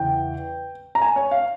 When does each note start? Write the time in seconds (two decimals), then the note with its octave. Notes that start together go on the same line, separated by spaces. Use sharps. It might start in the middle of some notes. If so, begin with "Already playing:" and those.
Already playing: E2 C#3 E3 G5
0.95 A#5
1.02 G#5
1.16 C#5
1.31 F5